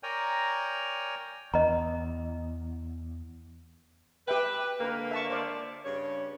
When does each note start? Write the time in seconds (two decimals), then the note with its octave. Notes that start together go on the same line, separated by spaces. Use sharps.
0.03 A#4 C#5 D5 G5 G#5 A#5
1.54 E2 D#5 A#5
4.28 G4 B4 E5 G5
4.81 D3 A#3 A#4 B4
5.11 E5 A5 C#6
5.30 C5 D5 F5
5.85 G2 C#3 C#5